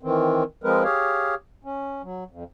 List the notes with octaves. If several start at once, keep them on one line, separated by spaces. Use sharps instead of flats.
D#3 E3 C4
F3 G#3 C4 A#4 B4
G4 G#4 C#5 F5
C#4
F#3
F2